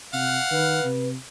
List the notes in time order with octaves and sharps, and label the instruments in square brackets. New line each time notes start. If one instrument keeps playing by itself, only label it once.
[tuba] C3 [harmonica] F5 F#5
[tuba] D#3 [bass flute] B4
[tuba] C3